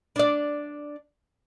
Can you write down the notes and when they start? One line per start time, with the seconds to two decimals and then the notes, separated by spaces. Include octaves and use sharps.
0.16 D4 D5